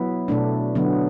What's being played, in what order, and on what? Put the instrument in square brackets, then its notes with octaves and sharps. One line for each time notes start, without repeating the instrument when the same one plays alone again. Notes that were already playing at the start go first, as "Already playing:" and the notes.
Already playing: [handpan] F#3 B3 E4
B2 A3 D4
D3 F#3 B3